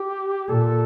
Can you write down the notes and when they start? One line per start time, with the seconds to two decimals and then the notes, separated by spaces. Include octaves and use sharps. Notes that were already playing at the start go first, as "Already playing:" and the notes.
Already playing: G4
0.48 A#2 A4